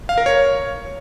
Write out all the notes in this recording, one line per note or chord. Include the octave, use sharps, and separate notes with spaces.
F5
A#4
C#5